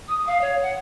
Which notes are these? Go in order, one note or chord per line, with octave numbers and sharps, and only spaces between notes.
D#6
F5
C#5
F#5